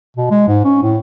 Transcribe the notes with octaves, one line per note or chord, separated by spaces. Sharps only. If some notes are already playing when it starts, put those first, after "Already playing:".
B2
G#3
G#2
C#4
A2